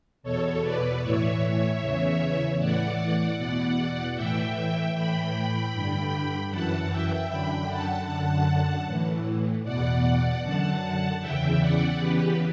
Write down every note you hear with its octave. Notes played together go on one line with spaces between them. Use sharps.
E2 B2 A4 C#5
B4 D5
A2 E3 C#5 E5
E2 C#3 E3
A2 E3 D5 F#5
E2 B2 D5 F#5
A2 E3 E5 G5
A2 E3 G5 B5
G2 D3
F#2 E3 F#5 A5
E5 G5
F#2 D3 G5 B5
F#5 A5
F#2 D3 F#5 A5
A2 E3
E2 B2 D5 F#5
F#2 D3 F#5 A5
E2 C#3 E3 E5 G5
D5 F#5
E2 C#3 E3 G4 B4